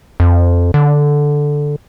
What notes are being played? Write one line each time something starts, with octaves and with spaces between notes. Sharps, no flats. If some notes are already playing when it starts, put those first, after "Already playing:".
F2
D3